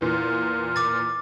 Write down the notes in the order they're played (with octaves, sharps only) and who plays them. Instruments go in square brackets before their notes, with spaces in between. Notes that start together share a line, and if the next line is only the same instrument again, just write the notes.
[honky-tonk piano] E2 A#2 E3 [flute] F6
[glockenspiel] D6 A6